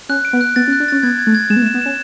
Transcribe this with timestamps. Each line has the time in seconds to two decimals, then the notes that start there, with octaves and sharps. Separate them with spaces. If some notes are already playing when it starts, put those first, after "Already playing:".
0.09 C#4 F#6
0.25 D7
0.33 B3
0.41 F#6
0.56 B3 A6
0.68 C#4
0.73 F#6
0.80 D4
0.88 C#4 A6
1.03 B3 G#6
1.19 G#6
1.27 A3
1.35 G#6
1.50 G#3 E7
1.56 B3
1.62 A3
1.66 E7
1.74 B3
1.82 C#4 E7